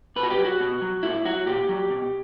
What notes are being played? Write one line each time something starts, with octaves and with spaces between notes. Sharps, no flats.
B2 B4
F#4
G4
F#3
F#4
B2
F#3
A#2 E4
F#3 F#4
A#2 G4
F#3
B2